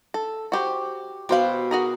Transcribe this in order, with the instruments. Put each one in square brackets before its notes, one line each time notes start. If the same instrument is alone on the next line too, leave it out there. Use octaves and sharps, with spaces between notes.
[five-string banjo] A4
F#4 G4 C5
[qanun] B2 B5 [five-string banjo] G4 C5 F5
[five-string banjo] F#4 G#4 A#4